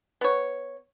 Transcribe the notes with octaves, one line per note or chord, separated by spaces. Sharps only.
B3 C#5